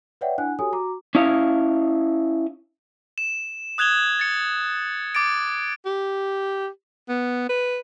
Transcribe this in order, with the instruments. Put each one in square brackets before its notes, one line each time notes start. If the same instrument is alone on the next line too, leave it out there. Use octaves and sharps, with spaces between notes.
[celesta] B4 C#5 D5 E5 F#5 G5
D4 E4 F#5 G#5 F#6
F#4 G4 A4 C#5 G#5 D#6
F#4 A#5 D6
[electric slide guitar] C#4 E4 D#5 F5
[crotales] E7
D#6 F#6 G#6 F7 G7
A6 C#7
D6 A6 D7
[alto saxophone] G4
B3
B4